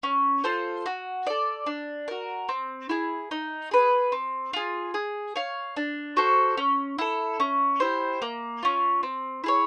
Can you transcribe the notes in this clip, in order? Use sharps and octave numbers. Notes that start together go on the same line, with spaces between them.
C#4
F4 A4 C5
F#4
A4 D5
D4
F#4 A#4
C4
E4 G#4
D#4
G#4 B4
C4
F4 G#4
G#4
C#5 F5
D4
F#4 A4 C5
C#4
E4 A4
C#4
E4 G4 C5
A#3
C#4 F4
C4
E4 G#4 C#5